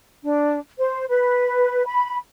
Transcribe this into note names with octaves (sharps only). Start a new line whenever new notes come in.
D4
C5
B4
B5